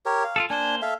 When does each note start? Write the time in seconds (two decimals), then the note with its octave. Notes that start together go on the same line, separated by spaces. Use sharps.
0.06 G4 A#4 C#5
0.24 F5
0.36 F4 G#4 A4
0.50 A#3 D4 C5 G#5
0.82 A4 E5 F5